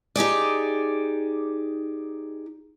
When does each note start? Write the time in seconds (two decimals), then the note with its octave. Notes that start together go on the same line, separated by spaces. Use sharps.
0.16 D#4 G4 G#4 D5